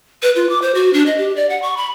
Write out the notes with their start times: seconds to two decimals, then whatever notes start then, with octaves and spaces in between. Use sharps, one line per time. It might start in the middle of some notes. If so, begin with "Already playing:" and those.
0.23 B4
0.36 F4
0.49 D6
0.62 C5
0.75 F#4
0.93 D4
1.06 D#5
1.18 G4
1.36 D5
1.50 F#5
1.62 C#6
1.77 B5